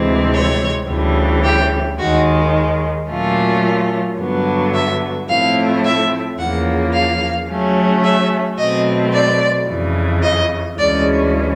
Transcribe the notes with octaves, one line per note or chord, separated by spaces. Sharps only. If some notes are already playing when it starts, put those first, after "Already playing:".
Already playing: D2 C3 E3 G#3 C4
C#5
D2 C#3 E3 G3
G4
D#2 D#3 G#3 F#4
A#2 F#3 A3 C#4 F4
G2 D3 F#3 B3
E5
A2 F3 A3 C4 E4 F5
E5
E2 C#3 F3 A#3 F#5
F5
C#3 F#3 A3 C#4
E5
B2 F#3 A3 C4 D#5
D5
F2 C#3 E3
D#5
D2 C#3 E3 G#3 C#4 D5